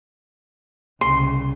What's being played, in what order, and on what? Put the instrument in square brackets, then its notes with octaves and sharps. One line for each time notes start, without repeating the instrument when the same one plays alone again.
[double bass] C2 C#3 [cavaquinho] C6